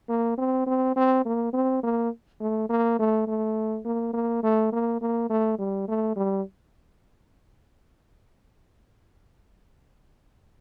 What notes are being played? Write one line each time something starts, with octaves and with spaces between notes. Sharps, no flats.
A#3
C4
C4
C4
A#3
C4
A#3
A3
A#3
A3
A3
A#3
A#3
A3
A#3
A#3
A3
G3
A3
G3